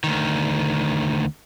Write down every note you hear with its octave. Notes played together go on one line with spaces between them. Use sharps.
D2 D#3